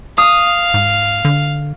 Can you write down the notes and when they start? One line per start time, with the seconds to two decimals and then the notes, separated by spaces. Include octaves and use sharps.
0.18 F5 D#6
0.74 G#2
1.25 D3